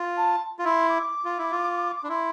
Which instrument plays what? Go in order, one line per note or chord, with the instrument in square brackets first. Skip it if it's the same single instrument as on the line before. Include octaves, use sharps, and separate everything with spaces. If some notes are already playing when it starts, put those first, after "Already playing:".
Already playing: [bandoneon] F4
[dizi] A5
[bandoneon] F4
[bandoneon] E4 [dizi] C6
[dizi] D6
[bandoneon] F4
E4
F4
[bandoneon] D4 [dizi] B5
[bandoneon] E4 [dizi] C6